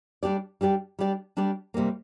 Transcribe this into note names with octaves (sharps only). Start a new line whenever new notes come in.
G3 D4 G4 D5
G3 D4 G4 D5
G3 D4 G4 D5
G3 D4 G4 D5
C3 G3 A#3